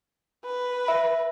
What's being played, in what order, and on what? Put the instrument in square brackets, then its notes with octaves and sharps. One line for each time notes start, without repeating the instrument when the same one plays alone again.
[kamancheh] B4
[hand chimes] E5